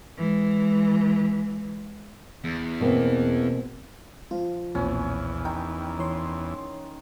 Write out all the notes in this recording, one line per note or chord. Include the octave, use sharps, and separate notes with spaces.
E3 G#3
E2
B2 A#3 C4
F3 F4
B1 E2 A#2 C4 C#4
D#3 G5
E3 C#5 C6